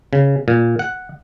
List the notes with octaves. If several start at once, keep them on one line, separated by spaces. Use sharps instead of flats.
C#3
A#2
F#5